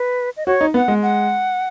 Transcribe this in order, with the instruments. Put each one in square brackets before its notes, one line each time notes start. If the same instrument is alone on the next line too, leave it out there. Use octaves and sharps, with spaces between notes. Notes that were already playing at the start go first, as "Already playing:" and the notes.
Already playing: [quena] B4
D#5
[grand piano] F#4 [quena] C#5
[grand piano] D#4
[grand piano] B3 [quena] F#5
[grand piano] G#3
[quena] F#5